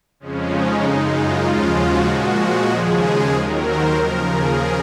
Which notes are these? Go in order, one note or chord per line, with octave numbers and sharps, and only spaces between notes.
F2 C#3 F3 G#3 C#4
D#4
F#2 C#3 G#3 D#4
F4
D#2 C#3 F3 G#3
F#4
A#2 F3 G#3 F#4
D#2 C#3 F3 G#3 G#4
D#2 D#3 F#3 A#4
C5
D#2 C#3 F3 A#4
G#4